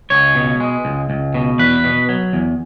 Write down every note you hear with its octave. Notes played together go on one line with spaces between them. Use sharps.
C#2 C#5
B2
G#3
C#2
C#2
B2
E2 B4
B2
F#3
E2